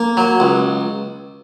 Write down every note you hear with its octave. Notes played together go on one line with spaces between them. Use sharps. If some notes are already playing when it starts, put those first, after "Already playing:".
Already playing: A#3
F#3
C#2